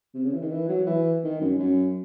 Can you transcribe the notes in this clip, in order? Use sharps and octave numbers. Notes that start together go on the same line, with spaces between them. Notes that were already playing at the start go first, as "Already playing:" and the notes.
C3
C#3
E3
D#3
E3
F#3
E3
D#3
F#2
F#2